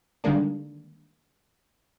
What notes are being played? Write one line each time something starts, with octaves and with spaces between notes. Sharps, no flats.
D3 D#3 G3 G#3 A#3 D4